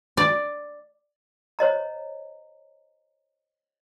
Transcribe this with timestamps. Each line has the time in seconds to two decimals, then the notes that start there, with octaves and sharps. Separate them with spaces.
0.17 D5
1.59 C5 C#5 D#5 A#5